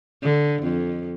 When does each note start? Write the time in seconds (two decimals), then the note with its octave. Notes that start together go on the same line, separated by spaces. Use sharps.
0.22 D3
0.63 F2